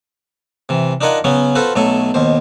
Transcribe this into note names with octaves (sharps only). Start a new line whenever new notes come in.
C3 E3
D4 D#4 F4 A#4 F#5 G#5
C#3 F#3 B3 C#4
F4 F#4 A4 B4 C5
B1 F#3 A3 A4 G#5
D#2 B2 C5